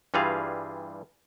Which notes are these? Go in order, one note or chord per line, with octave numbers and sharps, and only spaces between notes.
G2 E3 G3 F4 G#4 F5